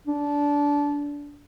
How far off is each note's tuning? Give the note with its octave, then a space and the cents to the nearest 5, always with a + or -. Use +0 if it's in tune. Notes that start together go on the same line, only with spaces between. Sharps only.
D4 -20